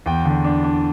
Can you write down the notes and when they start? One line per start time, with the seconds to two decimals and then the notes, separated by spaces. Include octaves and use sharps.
0.06 E2 G5
0.25 D3
0.44 D4
0.64 D4